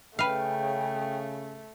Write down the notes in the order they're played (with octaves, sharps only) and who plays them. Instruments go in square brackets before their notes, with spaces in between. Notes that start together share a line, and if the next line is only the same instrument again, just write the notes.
[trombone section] C#3 [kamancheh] A3 [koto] B4 F5 [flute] G5